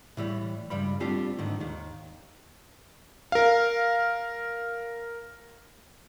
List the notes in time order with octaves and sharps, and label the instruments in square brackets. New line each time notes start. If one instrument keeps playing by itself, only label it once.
[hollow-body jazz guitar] A2 E3 G3
C#2 G2 G3 B5
G3 A3 C4 D4 F4 G4
G#2 D3 D#3
D#2 D#3
[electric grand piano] A#4 F5